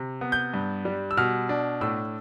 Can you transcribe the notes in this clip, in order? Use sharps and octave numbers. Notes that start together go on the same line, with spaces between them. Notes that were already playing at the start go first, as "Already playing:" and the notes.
Already playing: C3
B3
G6
G2
G3
E6
B2 F6
D4
A2 E6